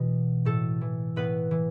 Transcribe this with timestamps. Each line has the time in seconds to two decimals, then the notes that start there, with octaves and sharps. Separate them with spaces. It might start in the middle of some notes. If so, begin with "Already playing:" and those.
Already playing: B2 E3
0.45 A2 A4
0.81 E3
1.16 A2 B3 B4
1.51 E3